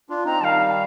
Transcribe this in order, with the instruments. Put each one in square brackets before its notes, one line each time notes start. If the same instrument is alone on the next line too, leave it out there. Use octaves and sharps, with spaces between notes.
[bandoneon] D4 F4
[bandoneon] C4 D#4 [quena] A#5
[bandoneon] D#3 G3 [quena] F5 A5